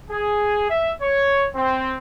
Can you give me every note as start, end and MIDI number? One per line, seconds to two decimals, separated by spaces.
0.11 0.68 68
0.70 0.91 76
1.02 1.46 73
1.55 1.96 60